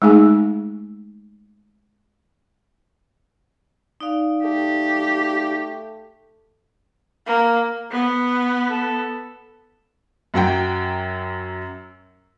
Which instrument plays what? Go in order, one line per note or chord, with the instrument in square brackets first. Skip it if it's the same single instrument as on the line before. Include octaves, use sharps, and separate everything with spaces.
[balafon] G#3 A3 D#4 G#4 G#5
[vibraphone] D#4 D5 F5
[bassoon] A3 [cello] G4
[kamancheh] A#3
[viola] B3
[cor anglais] A4
[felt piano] F#2 F#3 F#5 G5